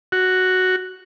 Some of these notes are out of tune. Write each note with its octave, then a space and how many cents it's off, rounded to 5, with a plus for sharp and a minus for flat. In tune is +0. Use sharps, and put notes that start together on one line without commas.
F#4 +5